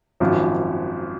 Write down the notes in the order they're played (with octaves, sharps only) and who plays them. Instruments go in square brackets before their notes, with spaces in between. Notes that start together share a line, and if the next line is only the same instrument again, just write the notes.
[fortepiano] G#1 F#2 F3